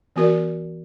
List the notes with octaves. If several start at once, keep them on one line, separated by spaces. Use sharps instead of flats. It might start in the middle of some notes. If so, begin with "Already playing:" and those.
E3 B3 F#4 A#4 D5